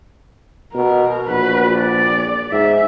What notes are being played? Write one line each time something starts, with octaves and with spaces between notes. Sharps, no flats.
B2 A#4
A#1 F#4 B4
D5
G#2 E5